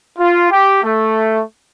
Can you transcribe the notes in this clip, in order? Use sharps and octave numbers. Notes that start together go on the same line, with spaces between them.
F4
G4
A3